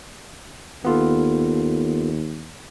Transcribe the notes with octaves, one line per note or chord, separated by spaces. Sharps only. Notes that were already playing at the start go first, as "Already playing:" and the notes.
D#2 B3 F4 A4